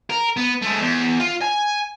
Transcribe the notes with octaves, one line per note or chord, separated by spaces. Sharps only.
A#4
B3
G#3 A3
E2
F4
G#5